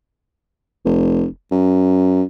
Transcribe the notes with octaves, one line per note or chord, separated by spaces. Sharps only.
F1
F#2